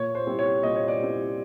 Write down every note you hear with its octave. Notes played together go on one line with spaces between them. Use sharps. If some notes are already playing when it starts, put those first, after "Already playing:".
Already playing: A#2 C#5
C5
G3 C4 E4
C#5
A#2 D#5
C#5
D5
G3 C4 E4